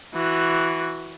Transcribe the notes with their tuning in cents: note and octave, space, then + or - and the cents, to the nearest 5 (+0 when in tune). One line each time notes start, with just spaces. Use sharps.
E3 +0 F#4 +0